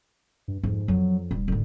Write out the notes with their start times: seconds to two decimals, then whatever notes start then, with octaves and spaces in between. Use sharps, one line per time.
0.48 G2
0.63 F2 G#2
0.88 F2 F#3
1.31 D#1 G2
1.48 G#1 D2